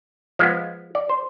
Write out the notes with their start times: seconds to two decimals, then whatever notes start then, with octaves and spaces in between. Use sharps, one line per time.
0.39 F3 G#3 B3 F5
0.95 D5
1.09 C5